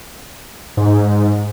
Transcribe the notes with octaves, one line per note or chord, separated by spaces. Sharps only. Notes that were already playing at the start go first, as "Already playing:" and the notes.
G#2